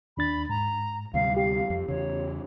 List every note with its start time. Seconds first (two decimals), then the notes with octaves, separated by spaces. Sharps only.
0.17 D#2 D4 B5 A6
0.49 G#2 A#5
1.14 D2 C3 G3 F5
1.37 G4 F5
1.70 F2
1.88 E2 C#3 C#5